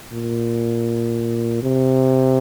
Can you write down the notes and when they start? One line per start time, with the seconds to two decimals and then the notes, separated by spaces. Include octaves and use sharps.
0.12 A#2
1.63 C3